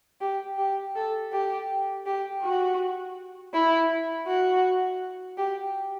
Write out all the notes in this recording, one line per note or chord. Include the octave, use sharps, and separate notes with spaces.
G4
G4
A4
G4
G4
F#4
E4
F#4
G4